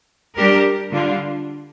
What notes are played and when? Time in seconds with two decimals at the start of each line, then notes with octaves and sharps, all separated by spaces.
0.35 G3 D4 G4 A#4
0.92 D3 G3 D4 F4